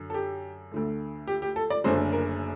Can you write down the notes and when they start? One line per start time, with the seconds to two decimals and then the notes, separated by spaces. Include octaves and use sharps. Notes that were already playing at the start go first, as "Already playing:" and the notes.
Already playing: F#2 D3 F#3
0.10 A4
0.14 G4
0.72 D2 D3 A3
1.27 G4
1.42 G4
1.56 A4
1.70 D5
1.84 F#1 F#2 D3 A3 D4 C5
2.12 A#4